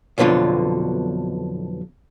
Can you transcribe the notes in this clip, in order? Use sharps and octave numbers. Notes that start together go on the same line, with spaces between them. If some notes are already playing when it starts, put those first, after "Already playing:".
B1 F2 B2 D3 F4